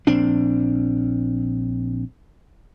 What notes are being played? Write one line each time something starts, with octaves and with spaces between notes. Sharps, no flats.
A#1 C4 D4